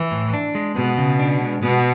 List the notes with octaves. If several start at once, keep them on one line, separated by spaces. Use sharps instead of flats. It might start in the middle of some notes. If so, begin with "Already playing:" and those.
Already playing: E3
A2
D4
G#3
B2 B3
C#3
D4
G#3
B2 B3